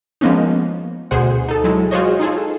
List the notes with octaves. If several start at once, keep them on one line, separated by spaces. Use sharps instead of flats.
F3 G#3 A#3 B3 C#4 D#4
D2 B2 G#4 C5 F#5
D#4 A4
F#3 G#3 E4
F4 F#4 G#4 C5 C#5 D#5
D#4 F4 G#4 A4